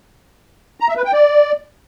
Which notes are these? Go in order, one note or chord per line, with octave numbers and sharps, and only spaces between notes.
A#5
E5
B4
G5
D5